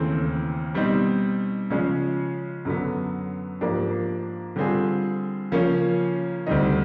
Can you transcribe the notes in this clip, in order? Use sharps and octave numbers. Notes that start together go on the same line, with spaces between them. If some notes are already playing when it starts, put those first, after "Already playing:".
Already playing: D#2 C#3 E3 A3 C4
B2 G3 C4 D#4
C#3 F3 G#3 C#4
F#2 D3 F#3 B3
G#2 F3 A#3 D4 G4
D3 G3 C4 F4 G#4
C#3 F3 A#3 C#4
D2 D3 G3 C4 D#4